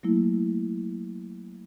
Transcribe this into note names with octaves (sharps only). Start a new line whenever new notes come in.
F#3 A3 A#3 E4